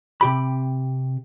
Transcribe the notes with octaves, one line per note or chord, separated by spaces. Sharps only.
C3 G4 B5